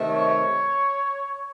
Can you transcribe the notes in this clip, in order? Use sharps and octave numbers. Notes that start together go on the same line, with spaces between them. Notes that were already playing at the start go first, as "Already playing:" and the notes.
Already playing: C3 D#3 A3
C#5